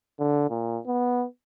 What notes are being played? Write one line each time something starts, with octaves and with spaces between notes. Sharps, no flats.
D3
A#2
B3